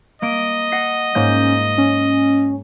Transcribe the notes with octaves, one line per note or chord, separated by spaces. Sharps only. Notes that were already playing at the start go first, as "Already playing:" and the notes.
A#3 D#5 D7
F#5 A#6 C7
G#2 A#3 C#4 G6
C#4